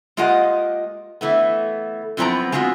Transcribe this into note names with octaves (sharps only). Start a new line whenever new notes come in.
G#3 A#3 F4 G4 D#5 F#5
E3 A3 B3
F#2 F3 B3 C4 E4 A#5
G#3 B3 C4 F4 F#4